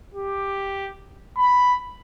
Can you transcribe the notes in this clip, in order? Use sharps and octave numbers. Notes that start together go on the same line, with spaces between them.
G4
B5